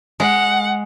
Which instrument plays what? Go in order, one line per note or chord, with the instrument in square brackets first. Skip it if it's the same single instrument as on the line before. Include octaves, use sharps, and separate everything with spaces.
[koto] G#3 [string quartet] F#5